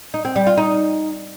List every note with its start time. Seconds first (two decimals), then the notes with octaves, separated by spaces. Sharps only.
0.14 D#4
0.25 C4
0.36 G3
0.47 F4
0.58 D#4